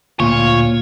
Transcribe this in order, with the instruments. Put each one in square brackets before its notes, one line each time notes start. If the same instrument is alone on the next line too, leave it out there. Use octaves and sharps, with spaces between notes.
[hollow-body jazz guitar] D2 A#2 [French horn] F4 [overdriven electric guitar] C#5